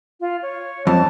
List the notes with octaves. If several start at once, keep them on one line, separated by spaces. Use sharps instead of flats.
F4
C#5
F2 A5